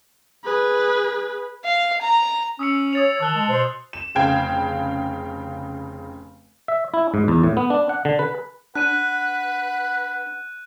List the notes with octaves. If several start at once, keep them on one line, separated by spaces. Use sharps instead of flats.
G#4 B4
F5
A#5
C#4 D#6 E6 C#7
C#5 D#6 A6 F7
D#3 A5 E6 F#6 G7
G#3
B2 C5
E7
F1 C#3 F5 G5 G#6
E5
E4
G#2
E2
A2
B3
D4
F#5
D3
B4
D4 B4 F#5 F#6 D#7